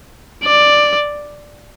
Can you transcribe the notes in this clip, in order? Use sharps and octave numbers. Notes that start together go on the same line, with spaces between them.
D5